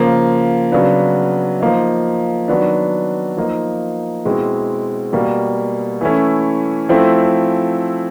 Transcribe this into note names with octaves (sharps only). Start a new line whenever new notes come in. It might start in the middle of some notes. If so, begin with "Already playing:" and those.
Already playing: C#3 F3 A#3
C#3 F#3 B3 D4
F3 A#3 D#4
D#3 F#3 B3 D4
F3 A#3 D#4
B2 G#3 C4 E4
B2 G3 A#3
E3 A3 C#4 E4
F3 A3 C4 E4